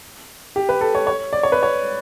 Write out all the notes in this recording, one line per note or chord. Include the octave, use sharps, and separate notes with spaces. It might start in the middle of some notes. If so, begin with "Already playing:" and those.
G4
B4
A4
C#5
C#5
D5
C#5
B4
C#5